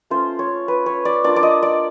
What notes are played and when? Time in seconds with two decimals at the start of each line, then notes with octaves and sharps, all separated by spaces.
0.10 A3 C#4 F4 C5
0.39 C#5
0.68 B4
0.86 C#5
1.05 D5
1.24 A#3 D4 F4 D5
1.36 D5
1.43 D#5
1.63 D5